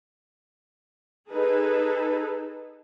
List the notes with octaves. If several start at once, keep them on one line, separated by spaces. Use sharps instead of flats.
D#4 G#4 A4 B4